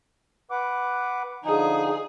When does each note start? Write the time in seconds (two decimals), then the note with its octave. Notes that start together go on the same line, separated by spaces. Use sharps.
0.51 B4 F#5 D6
1.44 D3 F3 D#4 G#4